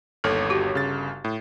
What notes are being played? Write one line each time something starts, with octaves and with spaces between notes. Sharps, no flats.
G1 D#2 A4 C#5
F#4 G4
G1 C#3 A6
A2